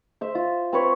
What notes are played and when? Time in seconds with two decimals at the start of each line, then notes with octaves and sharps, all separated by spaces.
0.21 C5 E5
0.35 F4
0.73 C4 B4 C#5